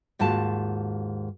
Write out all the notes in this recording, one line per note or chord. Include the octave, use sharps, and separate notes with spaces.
D#2 G#2 F4 F#4 A5